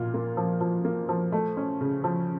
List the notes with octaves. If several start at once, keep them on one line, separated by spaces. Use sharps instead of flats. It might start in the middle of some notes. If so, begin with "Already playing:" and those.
Already playing: A#2 F4
A#3
F3
F3
A#3
F3
A3
C#4
C#3
F3